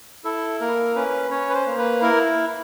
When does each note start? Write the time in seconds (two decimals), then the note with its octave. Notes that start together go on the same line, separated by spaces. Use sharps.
0.24 E4 A4
0.60 A#3 A#4
0.95 C#4 B4
1.31 C#4 C#5
1.49 B4
1.54 C5
1.66 A#3
1.78 B4
2.02 E4 A#4